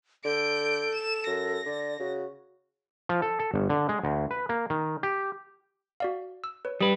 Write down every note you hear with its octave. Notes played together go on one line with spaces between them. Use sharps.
D3 A4 G6 D7
E7
F#2 A#6
D3 D5
C#3 F#4
F3
A4
A4
G1
D3
G#3
D2
B4
A#3
D#3
G4
F#4 D5 F5
E6
B4 C#5
G3 B4 D#6